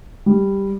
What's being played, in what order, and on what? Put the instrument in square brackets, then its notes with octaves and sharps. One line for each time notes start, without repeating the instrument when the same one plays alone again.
[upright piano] G3